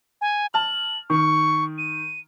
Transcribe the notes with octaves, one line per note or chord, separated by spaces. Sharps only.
G#5
A5 F6 F#7
D#3 C#6
D#7